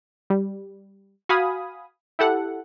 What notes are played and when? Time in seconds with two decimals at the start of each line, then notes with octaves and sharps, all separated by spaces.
0.30 G3
1.29 F#4 F5 G#5 B5 D#6
2.19 E4 G4 A4 F#5